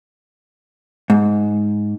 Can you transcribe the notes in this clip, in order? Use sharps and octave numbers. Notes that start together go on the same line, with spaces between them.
G#2